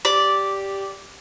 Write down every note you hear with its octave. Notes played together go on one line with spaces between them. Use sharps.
G4 D5